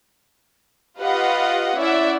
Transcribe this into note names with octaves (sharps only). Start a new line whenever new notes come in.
F4 G4 B4 D#5 F5 F#5
C#4 E4 D5 E5 F#5